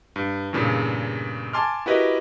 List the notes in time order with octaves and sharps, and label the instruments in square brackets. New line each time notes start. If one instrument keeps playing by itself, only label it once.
[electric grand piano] G2
E2 G2 A#2 C#3
G#5 A5 C6 D6 F6
E4 F#4 G4 A#4 B4 D#5